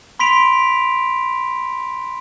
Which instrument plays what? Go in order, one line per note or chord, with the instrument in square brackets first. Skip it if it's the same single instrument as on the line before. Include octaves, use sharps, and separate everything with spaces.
[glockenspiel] B5 C6 B6 D7 F7